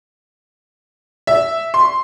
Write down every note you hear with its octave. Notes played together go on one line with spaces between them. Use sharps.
E5
C6